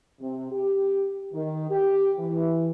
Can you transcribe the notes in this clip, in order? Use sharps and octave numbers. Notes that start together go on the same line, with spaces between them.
C3
G4
D#3
G4
E3